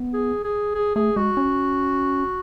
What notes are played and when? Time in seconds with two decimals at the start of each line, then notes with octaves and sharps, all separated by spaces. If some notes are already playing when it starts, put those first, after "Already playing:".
Already playing: B3
0.14 G#4
0.45 G#4
0.75 G#4
0.95 A3 G#4
1.16 G#3 F#4
1.37 C#4